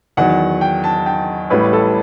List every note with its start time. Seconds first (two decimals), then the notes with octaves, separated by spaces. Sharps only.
0.17 E2 D#3 F#3 F#5
0.61 G5
0.84 A5
1.06 G5
1.50 A1 A2 G3 B4
1.73 A4